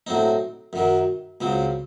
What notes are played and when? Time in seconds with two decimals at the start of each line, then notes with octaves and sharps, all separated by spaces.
0.07 A2 F#3 C4 D#4
0.73 F#2 D#3 F#3
1.41 C#2 C#3 F#3 C4